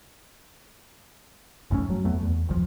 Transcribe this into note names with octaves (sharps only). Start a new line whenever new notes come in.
G1 F#2 A3 C#4
F#3
F2 A3 B3
E2
G#1 E2 F3